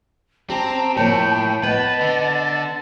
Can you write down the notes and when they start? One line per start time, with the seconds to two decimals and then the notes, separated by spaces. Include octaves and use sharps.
0.50 C4 G4 A5 A#5
0.97 A2 F3 A#3 C#5 G5
1.63 B3 B4 D#5 A5
2.01 D3